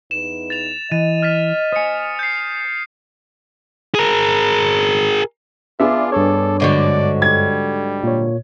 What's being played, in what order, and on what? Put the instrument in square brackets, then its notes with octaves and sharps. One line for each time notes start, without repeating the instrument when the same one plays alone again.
[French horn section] E2 D#4 B4 [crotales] E7
[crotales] A6 F7
[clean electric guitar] E3 [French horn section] D#5 [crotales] A6 D#7
[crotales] F6 A6 B6
[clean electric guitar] C5 G#5 [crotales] D#6 C#7
[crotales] G6 C7
[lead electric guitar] G#4 A#4
[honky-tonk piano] B3 D4 G#4 [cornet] F4 [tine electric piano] E5
[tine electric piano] G2 C#5 [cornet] A4
[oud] G#2 D3 F#3 [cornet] D5
[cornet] G3 [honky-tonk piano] G#6
[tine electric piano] A#2 C#5